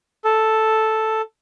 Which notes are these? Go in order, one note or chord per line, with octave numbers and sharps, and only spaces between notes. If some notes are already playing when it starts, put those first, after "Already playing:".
A4